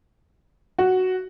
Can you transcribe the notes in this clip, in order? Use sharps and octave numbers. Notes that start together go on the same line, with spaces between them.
F#4